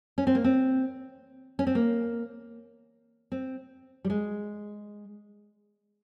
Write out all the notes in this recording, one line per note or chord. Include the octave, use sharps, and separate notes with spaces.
C#4
C4
A#3
C4
C#4
C4
A#3
C4
G3
G#3